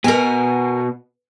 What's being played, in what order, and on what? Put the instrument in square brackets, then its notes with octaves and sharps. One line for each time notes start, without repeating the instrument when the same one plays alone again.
[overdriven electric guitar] B2 [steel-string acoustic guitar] A#4 G#5